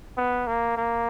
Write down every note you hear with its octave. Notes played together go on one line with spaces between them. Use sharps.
B3
A#3
A#3